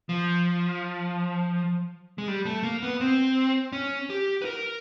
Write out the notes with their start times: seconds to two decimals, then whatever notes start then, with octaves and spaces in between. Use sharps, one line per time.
0.09 F3
2.18 G#3
2.28 G3
2.45 A3
2.63 A#3
2.83 B3
3.01 C4
3.73 C#4
4.10 G4
4.42 B4
4.45 A#4